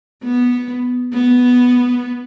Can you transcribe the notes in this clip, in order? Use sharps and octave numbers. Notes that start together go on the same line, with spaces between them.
B3
B3